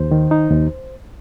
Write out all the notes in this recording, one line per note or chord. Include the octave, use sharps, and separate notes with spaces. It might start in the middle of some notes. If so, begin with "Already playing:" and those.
Already playing: D#2 C5
D#3
D#4
D#2